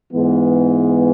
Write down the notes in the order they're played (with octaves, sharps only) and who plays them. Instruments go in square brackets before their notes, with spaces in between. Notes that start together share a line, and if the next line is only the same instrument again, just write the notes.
[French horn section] G#2 E3 G#3 B3